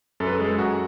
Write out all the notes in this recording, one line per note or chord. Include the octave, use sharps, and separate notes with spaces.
F#2 A4
B4
A4
G#3
F#2 F#4